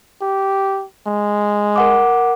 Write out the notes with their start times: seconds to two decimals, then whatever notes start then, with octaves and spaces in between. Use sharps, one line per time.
0.22 G4
1.07 G#3
1.76 A#4 F#5 D6